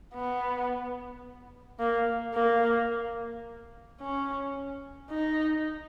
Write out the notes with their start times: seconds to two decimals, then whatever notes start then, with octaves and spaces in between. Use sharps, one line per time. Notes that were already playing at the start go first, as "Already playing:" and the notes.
0.14 B3
1.79 A#3
2.34 A#3
4.00 C#4
5.10 D#4